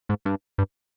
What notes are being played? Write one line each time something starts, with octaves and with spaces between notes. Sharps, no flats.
G#2
G2
G2